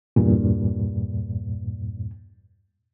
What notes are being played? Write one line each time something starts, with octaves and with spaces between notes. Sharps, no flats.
E2 G2 A#2